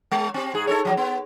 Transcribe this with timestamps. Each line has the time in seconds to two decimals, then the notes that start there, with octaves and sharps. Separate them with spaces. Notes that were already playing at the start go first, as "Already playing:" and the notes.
0.12 G#3
0.34 C4 G4
0.54 G#2 G#4
0.67 D#4 A4 C#5
0.85 F3 F#3
0.97 B3